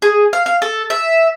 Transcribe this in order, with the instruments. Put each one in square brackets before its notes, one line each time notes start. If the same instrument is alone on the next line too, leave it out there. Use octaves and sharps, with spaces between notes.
[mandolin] G#4
F5
F5
A4
E5